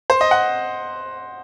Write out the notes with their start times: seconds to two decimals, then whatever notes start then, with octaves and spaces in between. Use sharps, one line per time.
0.10 C5
0.21 D#5
0.31 F#5